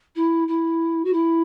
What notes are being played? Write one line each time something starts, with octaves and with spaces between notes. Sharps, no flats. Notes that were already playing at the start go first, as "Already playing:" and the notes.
E4
E4
F#4
E4